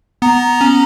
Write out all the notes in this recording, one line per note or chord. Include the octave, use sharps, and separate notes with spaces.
B3 A#5
C#4